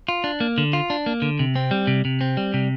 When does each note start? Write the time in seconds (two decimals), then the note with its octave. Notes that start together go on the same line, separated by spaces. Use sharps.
0.09 F4
0.24 D4
0.40 A#3
0.58 D3
0.73 F4
0.90 D4
1.06 A#3
1.22 D3
1.39 C3
1.56 C4
1.71 G3
1.87 C3
2.05 C3
2.21 C4
2.37 G3
2.54 C3